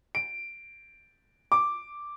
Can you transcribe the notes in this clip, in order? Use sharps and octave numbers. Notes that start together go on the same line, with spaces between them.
D7
D6